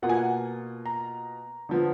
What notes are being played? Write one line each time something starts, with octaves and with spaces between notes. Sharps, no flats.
B2 A#3 F4 F#5
G#5
F#5
A#5
D3 F3 B3